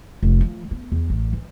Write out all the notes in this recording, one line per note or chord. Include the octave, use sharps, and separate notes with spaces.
F1
F3
B3
E2
A1
E3